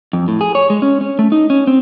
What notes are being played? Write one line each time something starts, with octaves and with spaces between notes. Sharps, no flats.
F2
A2
G#4
C#5
G#3
C#4
C#4
A3
D#4
C#4
C4